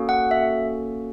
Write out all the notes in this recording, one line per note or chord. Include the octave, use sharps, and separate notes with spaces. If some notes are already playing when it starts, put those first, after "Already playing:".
Already playing: A#3 C#4 F#4 A4
F#5
E5